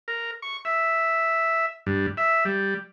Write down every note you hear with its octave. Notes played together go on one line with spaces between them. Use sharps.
A#4
C#6
E5
G2
E5
G3